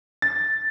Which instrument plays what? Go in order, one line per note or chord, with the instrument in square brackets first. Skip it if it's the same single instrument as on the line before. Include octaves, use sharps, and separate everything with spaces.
[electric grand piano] A6